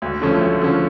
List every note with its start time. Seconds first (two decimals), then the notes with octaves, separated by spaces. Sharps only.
0.02 D2
0.21 D3 F3 A3 C#4
0.41 D2
0.60 D3 F3 A3 C#4